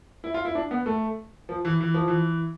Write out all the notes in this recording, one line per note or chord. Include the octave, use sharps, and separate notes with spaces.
E4
F4
E4
D4
B3
A3
F3
E3
E3
F3
E3